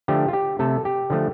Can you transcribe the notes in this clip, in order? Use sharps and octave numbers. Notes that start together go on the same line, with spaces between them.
D3 F3 A3 G4
F4
G4
C3 A3 A4
G4
D3 F3 A3